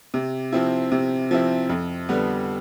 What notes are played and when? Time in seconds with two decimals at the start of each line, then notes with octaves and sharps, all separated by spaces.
0.14 C3
0.52 F3 C4 E4
0.92 C3
1.31 F3 C4 E4
1.69 F2
2.09 D3 G3 B3